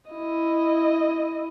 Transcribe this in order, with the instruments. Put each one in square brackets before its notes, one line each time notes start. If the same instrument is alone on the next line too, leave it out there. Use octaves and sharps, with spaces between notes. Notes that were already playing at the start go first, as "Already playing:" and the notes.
[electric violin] E4 D#5